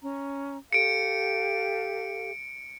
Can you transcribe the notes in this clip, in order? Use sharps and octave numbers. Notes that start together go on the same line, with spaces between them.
C#4 A#5
G4 A4 F5 C#7 D7